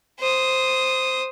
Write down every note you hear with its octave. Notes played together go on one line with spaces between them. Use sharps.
C5 D#6